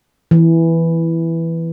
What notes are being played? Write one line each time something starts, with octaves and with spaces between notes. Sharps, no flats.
E3